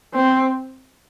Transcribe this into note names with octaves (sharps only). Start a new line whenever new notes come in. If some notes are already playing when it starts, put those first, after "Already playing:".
C4